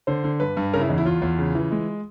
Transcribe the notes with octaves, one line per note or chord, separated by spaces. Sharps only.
D3 C5
D3
G2 B4
G2
C#3 A#4
E4
E2 D#4
E4
E2 F4
E2
C#3
E3
G#3